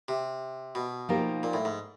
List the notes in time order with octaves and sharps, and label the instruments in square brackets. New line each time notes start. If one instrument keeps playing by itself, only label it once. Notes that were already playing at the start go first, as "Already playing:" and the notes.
[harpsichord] C3
B2
[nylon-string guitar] F3 A#3 D#4 G4 A#4
[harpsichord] A#2
A2
G#2